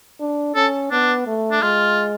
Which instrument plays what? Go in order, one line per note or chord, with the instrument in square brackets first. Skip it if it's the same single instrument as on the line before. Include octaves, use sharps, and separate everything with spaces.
[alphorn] D4
[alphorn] C#4 [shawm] A4
[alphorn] B3 [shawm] D4
[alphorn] A3
[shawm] D4
[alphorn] G#3 [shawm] F4